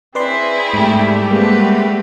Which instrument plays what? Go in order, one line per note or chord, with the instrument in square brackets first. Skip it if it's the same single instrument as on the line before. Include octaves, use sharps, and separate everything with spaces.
[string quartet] C4 E4 G#4 [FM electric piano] B4 D5 C6
[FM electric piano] G#2 [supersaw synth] G3 A3 G4
[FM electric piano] G#3 A#3 [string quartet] C4 B4 F#5